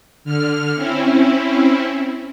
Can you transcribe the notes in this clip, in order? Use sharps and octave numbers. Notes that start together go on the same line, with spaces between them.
D3 F6
C4 C#4 E4